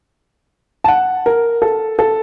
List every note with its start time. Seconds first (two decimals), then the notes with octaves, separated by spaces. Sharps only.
0.84 A5
0.88 F#5
1.26 A#4
1.62 A4
1.99 A4